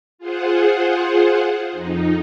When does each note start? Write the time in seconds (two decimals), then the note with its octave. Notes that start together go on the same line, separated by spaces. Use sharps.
0.18 F4 G#4 C5 F#5
1.72 F2 D#4